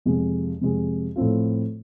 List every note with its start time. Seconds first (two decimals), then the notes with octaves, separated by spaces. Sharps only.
0.06 F2 C3 G#3
0.61 F2 C3 G#3
1.16 A2 F3 A3 C4 F4